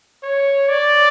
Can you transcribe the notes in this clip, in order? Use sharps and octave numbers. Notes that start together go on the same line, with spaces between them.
C#5
D5